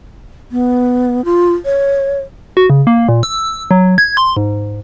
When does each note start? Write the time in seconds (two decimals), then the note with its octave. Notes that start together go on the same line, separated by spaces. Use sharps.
0.52 B3
1.25 F4
1.65 C#5
2.57 F#4
2.70 C#3
2.87 A#3
3.09 A#2
3.23 E6
3.71 F#3
3.98 G#6
4.17 C6
4.36 G#2